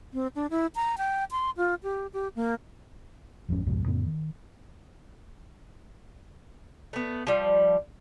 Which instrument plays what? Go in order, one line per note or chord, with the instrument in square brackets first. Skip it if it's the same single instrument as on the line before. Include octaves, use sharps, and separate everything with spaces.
[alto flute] C4
D4
E4
A#5
G5
C6
F4
G4
G4
A#3
[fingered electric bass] G#1 F2 G#2 C#4
C2 F2 G#2 B2
F2 A2 C#3 B3
D#3
[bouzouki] A3 B3
F3 G3